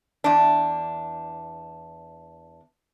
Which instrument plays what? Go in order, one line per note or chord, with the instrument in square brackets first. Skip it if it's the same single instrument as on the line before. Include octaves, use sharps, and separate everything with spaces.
[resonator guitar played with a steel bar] E2 D4